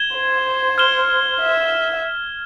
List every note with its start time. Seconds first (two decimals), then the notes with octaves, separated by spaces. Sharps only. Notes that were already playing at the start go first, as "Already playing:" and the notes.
Already playing: G#6 E7 G7
0.15 C5
0.78 F6 G#6 E7 G7
1.41 E5